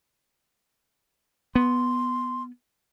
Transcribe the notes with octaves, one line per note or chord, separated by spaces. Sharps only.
B3 C6